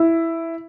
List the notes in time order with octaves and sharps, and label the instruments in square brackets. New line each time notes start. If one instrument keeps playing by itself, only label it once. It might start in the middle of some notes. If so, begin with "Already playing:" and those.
Already playing: [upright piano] E4